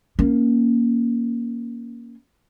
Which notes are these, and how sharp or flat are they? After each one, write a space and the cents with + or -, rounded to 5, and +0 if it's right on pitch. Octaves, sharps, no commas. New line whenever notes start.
A#3 +10 C#4 +0